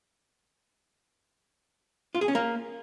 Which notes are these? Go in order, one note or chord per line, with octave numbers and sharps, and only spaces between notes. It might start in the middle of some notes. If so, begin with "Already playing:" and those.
F4
G#4
C#4
A#3